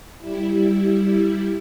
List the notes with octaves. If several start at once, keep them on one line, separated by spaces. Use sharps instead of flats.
G3 E4